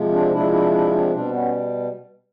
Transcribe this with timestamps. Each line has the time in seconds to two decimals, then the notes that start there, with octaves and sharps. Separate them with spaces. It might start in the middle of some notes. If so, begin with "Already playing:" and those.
Already playing: C3 F3 G#3
0.12 C4 D4
0.32 C3 F3 G#3 D4 E4
0.52 D4 E4
0.72 D4 E4
0.92 C4 D4
1.12 B2 G3 C4 D4
1.32 B3 C#4